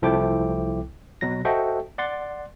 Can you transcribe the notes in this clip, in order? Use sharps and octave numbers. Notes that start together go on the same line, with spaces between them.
C2 F3 A3 E4 G5 D6
B2 F#3 A#6
F#4 A4 C5 D#5 E5 G5
D5 F#5 C6 A6